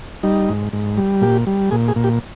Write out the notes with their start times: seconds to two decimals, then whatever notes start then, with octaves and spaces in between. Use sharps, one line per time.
0.23 G3 D#4
0.49 G#2
0.73 G#2
0.97 G3
1.21 A#2 G4
1.47 G3
1.71 A#2 G#4
1.88 G#4
1.96 A#2
2.04 G4